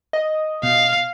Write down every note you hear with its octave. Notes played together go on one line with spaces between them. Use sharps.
D#5
B2 F5